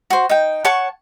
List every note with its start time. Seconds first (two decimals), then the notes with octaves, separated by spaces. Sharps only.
0.10 F#4 C5
0.29 D#4 G5
0.65 C#5 F#5 A5 C#6